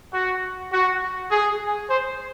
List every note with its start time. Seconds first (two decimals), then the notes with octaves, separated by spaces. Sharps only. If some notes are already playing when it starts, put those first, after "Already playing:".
0.12 F#4
0.72 F#4
1.30 G#4
1.89 C5